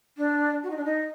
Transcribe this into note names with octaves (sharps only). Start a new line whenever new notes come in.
D4
F#4
D#4
D4
D#4